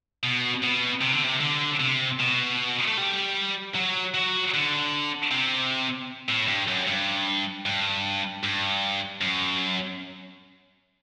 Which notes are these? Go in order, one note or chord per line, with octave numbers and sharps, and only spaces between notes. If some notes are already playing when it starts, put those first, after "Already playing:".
B2
B2
C3
D3
C3
D3
C3
B2
A3
G3
F#3
F#3
D3
C3
A2
G2
F#2
G2
G2
G2
F#2